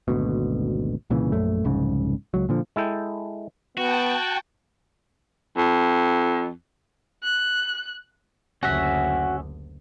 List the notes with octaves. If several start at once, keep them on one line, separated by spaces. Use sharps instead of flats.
G#1 D2 B2
C2 A#2 C#3 E3
A#1 F#2 A3
F1 C2 G#2 C#3
C#2 F#3
A#2 D3 F3
G#3 E4 A4 G5
B3 F#4 G5 A5
F2
F#6
F#1 D2 C#4 F#4 E5